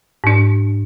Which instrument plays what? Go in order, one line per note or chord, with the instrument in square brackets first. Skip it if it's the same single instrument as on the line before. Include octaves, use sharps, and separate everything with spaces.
[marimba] G#2 D4